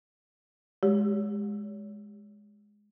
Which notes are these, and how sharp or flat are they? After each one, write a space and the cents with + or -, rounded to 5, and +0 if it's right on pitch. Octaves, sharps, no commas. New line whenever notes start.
G#3 +0 G4 +0 C#5 +35